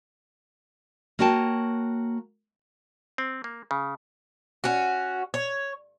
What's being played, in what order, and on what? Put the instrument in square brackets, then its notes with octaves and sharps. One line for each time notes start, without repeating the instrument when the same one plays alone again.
[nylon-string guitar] A#3 F#4 C#5 G5 A5
[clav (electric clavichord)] C4
A#3
C#3
[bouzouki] C#4 F#4
C#5